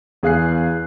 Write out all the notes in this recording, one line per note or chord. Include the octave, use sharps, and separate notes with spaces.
E2 G#4 F5 F#6 C7